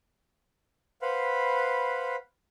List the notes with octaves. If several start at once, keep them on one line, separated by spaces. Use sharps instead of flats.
B4 C5 F5 F#5 B5